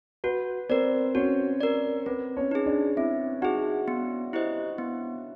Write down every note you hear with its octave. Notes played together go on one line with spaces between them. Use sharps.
F#4 B4
C4 A#4 C5 D5
C#4 F#4 C#5
A#4 D5
C4 B4
C#4 C#5
D#4 G#4
D4 D5
C4 E4 E5
D#4 F#4 G#4 F#5
B3
E4 G4 C5 D#5
B3